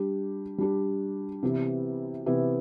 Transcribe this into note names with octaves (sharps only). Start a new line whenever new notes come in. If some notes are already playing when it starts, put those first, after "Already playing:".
Already playing: G3 D4 G4
G3 D4 G4
C3 E3 B3 E4 G4
C3 E3 B3 E4 G4